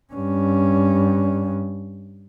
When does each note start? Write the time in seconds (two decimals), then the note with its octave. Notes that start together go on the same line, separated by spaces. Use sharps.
0.13 G2 C#4